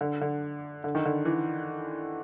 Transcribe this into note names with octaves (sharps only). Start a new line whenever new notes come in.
D3
D3
D3
D#3
D3
E3